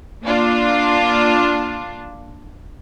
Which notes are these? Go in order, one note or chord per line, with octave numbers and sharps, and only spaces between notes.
A#3 D4 F4